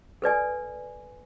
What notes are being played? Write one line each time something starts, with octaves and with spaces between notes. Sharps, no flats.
A4 B4 D5 G#5